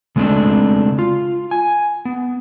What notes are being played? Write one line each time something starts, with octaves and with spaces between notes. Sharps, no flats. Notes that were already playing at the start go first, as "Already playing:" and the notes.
C#3 G#3 A3 C4 D4
F4
G#5
B3